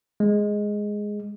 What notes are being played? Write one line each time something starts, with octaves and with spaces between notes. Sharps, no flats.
G#3